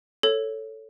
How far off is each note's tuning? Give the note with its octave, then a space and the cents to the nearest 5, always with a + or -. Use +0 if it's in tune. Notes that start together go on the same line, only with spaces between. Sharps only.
A4 +5 C#5 +0